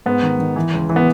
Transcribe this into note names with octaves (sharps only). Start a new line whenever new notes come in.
G#2 B3
D#3
D#3
E3
C#2
E3
B3